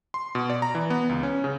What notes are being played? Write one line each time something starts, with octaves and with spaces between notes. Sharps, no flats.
C6
B2
D5
A#5
E3
B3
C#2
C#4
C#3